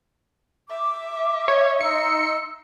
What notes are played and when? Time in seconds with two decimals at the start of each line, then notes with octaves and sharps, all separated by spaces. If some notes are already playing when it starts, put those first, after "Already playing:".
0.70 E5 D6
1.48 C#5
1.81 D#4 C6 E6 C#7